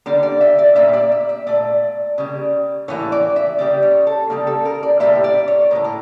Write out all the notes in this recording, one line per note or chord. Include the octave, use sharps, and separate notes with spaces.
D3 G3 A#3 D5
D5
E5
D5
A#2 G3 A#3 E5
D5
E5
E5
A#2 A3 D5
C#3 G3 A#3
A2 E3 A#3 C#5
D5
E5
C#3 G3 A#3 D5
C#5
A4
C#3 G3 A#3 A4
A4
A#4
D5
A2 E3 G3 A#3 E5
D5
C#5
A2 F3 A#3 A#4
A#4